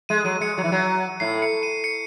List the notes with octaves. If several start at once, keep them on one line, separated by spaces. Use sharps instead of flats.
G#3 D#7
F#3 D#7
G#3 C#7
F#3
E3
F#3
A2 C7
C#7
D#7
C#7